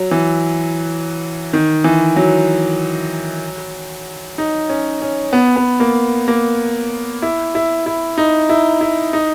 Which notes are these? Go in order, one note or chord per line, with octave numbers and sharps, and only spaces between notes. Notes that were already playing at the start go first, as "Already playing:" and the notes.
Already playing: F#3
E3
D#3
E3
F#3
D#4
C#4
C#4
B3
B3
A#3
A#3
E4
E4
E4
D#4
E4
E4
D#4